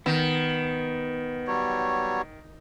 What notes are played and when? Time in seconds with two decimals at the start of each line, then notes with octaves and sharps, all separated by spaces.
0.06 D#3 B3
1.47 F#3 G3 C#5